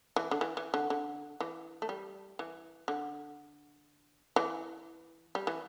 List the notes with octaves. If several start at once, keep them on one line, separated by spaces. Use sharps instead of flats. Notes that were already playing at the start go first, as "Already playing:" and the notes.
E3
D3
E3
E3
D3
D3
E3
A3
G3
E3
D3
E3
G3
E3